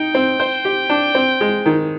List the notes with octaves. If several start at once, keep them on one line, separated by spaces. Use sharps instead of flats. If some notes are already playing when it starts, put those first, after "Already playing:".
Already playing: D#4 G5
C4
C5
G4
D4
C4
G#3
D#3